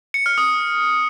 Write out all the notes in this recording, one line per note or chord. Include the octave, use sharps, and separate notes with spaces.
C#7
F6
D#6